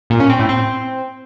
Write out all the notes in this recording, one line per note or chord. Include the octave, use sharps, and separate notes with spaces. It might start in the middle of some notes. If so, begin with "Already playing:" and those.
A#2
C#4
C4
A2
C4